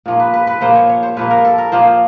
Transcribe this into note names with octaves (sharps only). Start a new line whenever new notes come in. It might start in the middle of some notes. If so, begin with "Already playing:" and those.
A#2 F3 A#3
B4
B4
B4
A#2 F3 A#3 C5
C#5
C#5
C5
A#2 F3 A#3 B4
A#4
A4
A#4
A#2 F3 A#3 C5